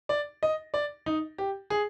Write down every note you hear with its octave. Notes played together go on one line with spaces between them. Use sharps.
D5
D#5
D5
D#4
G4
G#4